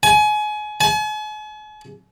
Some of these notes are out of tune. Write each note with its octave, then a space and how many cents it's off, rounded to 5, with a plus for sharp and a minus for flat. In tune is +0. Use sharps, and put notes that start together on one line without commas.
G#5 +30
G#5 +45